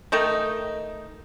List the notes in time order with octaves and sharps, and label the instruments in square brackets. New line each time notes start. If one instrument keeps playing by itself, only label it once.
[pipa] D#3 A3 D#4